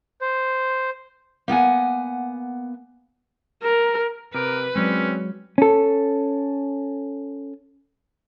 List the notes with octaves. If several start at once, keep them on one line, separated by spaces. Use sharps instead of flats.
C5
A#3 B3 F#5 G#5
A#4
C3 G4 A#4 B4 D7
F#3 G#3 C4 C#4 D5
C#4 A4